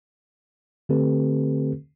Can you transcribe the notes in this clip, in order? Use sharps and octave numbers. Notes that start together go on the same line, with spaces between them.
D3 A3 C4 G4 A4 B4